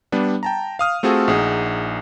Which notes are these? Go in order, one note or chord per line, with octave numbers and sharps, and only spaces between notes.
G3 B3 D4
G5 A5 A#5
F5 D#6 F6
A3 C4 F4 F#4 G#4 A4
A#1 D#4 G#4 F#5